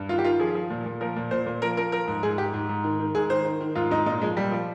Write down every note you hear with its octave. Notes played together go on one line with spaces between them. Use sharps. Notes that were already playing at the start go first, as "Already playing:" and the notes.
Already playing: G2
D#3 F4
G4
D#3 F4
F3 G#4
F3
A#2
A#2
F3 A#4
A#2
A#2 C5
A#2
F3 A#4
F3 A#4
F3 A#4
G#2
G#2 G#4
G#2 G4
G#2
G#2
D#3
D#3
G#2 G#4
D#3 C5
D#3
D#3
G#2 F4
G#2 D#4
A#2 D#4
F3 G#3
A#2 G3
F3